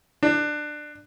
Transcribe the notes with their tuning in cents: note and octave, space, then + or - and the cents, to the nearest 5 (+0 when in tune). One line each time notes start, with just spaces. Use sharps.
D4 +20